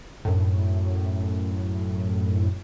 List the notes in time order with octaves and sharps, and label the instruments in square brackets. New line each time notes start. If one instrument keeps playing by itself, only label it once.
[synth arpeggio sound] F#2 A2